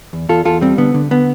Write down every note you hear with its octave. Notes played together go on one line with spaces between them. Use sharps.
E2
E2 F4 A4
E2 F4 A4
G3 C4
D3 B3
D3
D3 B3